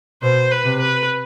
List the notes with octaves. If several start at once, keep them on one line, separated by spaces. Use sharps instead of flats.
B2 C5
B4
C3
B4